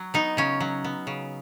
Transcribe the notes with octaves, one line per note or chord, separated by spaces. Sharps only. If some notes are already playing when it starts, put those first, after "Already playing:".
Already playing: F#3
B3 D#4
C#3 C#4
F#3
B3
C#3